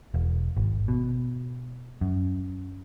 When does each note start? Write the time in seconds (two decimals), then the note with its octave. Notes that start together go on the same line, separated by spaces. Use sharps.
0.14 E1
0.56 G#1
0.88 B2
2.01 F#2